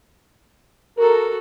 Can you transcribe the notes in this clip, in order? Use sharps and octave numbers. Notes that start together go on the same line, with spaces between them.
F#4 A4 A#4